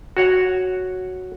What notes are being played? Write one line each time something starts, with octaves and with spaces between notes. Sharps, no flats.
F#4 C#5 F#5